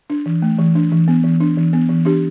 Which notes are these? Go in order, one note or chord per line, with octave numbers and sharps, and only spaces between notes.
D4
E3
A3
E3
D4
E3
B3
E3
D4
E3
B3
E3
D4 G4